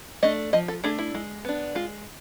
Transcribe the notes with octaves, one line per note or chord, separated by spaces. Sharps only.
A3 D4 D#5
F3 D#5
A4
A3 D4 G#4
E4
G#3
B3 D4
G#3 F4